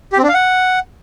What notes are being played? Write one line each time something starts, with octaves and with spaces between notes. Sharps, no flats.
G4
C4
D4
F5
F#5